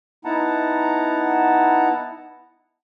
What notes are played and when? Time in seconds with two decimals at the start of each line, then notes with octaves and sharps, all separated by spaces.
0.25 B3 D#4 E4 F#5 A5 A#5